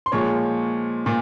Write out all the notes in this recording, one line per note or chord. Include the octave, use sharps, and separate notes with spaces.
C6
A#2 F3 G#3 C#5 C#6
A#2